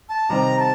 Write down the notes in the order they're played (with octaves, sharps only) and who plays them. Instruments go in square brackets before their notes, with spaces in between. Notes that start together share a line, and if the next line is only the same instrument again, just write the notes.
[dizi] A5
[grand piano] C3 D#3 G3 C4 [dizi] A#5
[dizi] A5